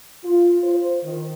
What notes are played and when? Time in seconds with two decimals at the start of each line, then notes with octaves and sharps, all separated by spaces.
0.24 F4
0.63 C5
1.04 D#3